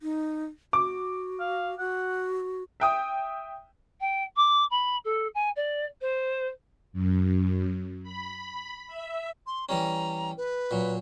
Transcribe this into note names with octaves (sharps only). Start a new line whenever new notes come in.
D#4
F#4 D6
F5
F#4 F#5
E5 G5 D#6
G5
D6
B5
A4
G#5
D5
C5
F#2
B5
E5
C6
E3 G3 C#4 A#5
B4
A#2 F#3